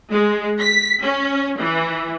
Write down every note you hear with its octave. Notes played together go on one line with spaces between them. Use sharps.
G#3
B6
C#4
E3